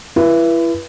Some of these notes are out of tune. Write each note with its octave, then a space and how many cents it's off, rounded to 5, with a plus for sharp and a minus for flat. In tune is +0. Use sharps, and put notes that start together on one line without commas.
E4 +30 B4 -25